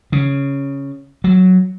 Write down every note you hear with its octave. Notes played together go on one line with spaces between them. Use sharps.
C#3
F#3